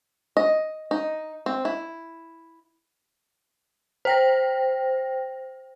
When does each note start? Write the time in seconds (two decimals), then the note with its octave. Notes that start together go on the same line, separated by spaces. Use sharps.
0.37 D#5
0.91 D#4
1.46 C4
1.65 E4
4.05 C5 G5 A#6